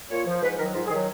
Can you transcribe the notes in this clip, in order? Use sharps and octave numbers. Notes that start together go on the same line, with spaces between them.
A#2 C#5
F3
G#2 B4
D#3 F#3 A#4
G#2 F4
G#4
D#3 F#3